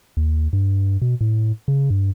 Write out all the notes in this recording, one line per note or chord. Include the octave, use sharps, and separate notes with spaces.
D#2
G2
B2
A2
C#3
G2